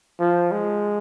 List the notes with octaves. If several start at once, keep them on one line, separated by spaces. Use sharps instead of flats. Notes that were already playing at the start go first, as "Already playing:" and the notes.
F3
G#3